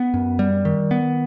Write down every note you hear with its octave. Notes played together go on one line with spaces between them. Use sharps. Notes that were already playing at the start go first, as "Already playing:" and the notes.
Already playing: B3
F#2
G3
D#3
B3